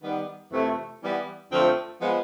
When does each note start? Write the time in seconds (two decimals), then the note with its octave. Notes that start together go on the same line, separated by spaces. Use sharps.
0.02 D#3 G3 B3
0.51 F2 C3 E3 A3
1.01 E3 G3 B3
1.50 F2 D3 F3 A3 C4
2.00 F3 G#3 B3